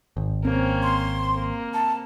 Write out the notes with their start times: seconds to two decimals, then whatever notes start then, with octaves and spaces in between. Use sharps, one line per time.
0.17 G#1
0.45 A#3 C4 C#4
0.83 C6
1.35 A#3
1.74 A5